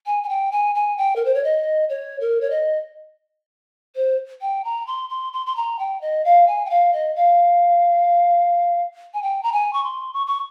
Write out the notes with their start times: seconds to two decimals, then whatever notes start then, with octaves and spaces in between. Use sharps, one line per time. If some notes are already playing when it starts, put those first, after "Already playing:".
0.06 G#5
0.23 G#5
0.29 G5
0.52 G#5
0.75 G#5
0.98 G5
1.16 A#4
1.25 C5
1.34 C#5
1.44 D#5
1.89 C#5
2.21 A#4
2.41 C#5
2.50 D#5
3.96 C5
4.41 G5
4.65 A#5
4.87 C6
5.10 C6
5.33 C6
5.47 C6
5.56 A#5
5.79 G5
6.01 D#5
6.25 F5
6.47 G#5
6.65 G5
6.70 F5
6.93 D#5
7.16 F5
9.14 G#5
9.23 G5
9.43 A#5
9.53 G#5
9.73 C#6
9.84 C6
10.14 C#6
10.27 C#6